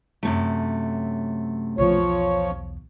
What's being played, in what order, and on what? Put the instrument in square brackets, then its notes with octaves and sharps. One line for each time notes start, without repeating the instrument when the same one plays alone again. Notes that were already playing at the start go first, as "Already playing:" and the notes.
[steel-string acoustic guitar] F#2 C3 A3
[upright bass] B1 E2 [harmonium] F3 C#5